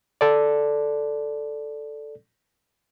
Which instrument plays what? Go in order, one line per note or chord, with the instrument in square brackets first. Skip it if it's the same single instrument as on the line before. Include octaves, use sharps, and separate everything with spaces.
[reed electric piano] A4 D5